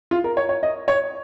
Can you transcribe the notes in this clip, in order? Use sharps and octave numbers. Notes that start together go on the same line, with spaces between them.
F4
A#4
C#5
C#5
D#5
C#5